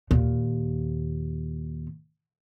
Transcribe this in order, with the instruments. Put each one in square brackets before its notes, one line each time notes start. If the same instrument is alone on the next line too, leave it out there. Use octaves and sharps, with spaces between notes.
[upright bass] D#2 A#2